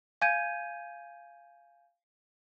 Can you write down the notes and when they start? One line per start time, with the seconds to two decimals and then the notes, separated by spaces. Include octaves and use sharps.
0.21 F5 G#5 G6 G#6 D#7